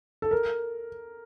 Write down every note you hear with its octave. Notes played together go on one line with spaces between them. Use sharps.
A4
A#4